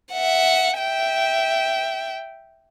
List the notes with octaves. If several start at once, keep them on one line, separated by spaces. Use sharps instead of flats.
E5 F#5
E5 G5